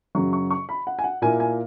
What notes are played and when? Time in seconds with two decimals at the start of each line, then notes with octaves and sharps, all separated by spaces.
0.15 F#2 C#3 F#3 C#6
0.33 C#6
0.51 C#6
0.69 B5
0.87 F#5
0.99 G#5
1.04 F#5
1.22 A#2 A#3 E4 G#5
1.40 G#5